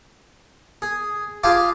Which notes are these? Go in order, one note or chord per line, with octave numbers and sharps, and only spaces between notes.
G#4
F4 G4 G#4 F5 A5 D6